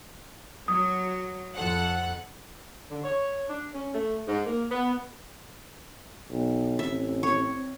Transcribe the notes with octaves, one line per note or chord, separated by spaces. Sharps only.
F#3 D#6
F2 A4 F#5
D3
C#5
D4
C#4
A3
G#2
A#3
B3
B1
A1 C4 E5
C#5